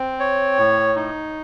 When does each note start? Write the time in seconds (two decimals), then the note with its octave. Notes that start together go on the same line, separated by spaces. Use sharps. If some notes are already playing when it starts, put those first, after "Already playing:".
Already playing: C4
0.20 C#5
0.58 A2
0.96 D#4